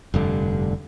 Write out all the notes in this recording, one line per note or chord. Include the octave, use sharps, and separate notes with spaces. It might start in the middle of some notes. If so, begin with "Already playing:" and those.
F1 G2 D3